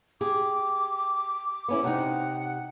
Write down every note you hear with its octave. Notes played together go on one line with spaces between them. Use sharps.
G4 G#4 D6
B3 C#4 E4 D6
C3 D#4 F#5